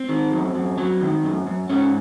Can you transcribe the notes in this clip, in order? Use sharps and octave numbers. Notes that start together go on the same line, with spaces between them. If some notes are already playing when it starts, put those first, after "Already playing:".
Already playing: C4
D#3
F#2
F#2
F#3
D#3
F#2
F#2
G#2 C#4